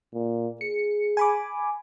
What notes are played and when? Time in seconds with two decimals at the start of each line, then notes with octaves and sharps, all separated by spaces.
0.14 A#2
0.61 G#4 C#7
1.17 G#5 B5 D6